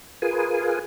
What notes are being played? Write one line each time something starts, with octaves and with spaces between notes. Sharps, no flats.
F4 G#4 A#4 B4 G#5